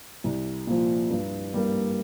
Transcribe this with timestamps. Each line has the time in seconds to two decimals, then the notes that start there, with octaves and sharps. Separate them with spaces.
0.24 C2
0.67 A#2 F3
1.10 G2
1.54 G3 A#3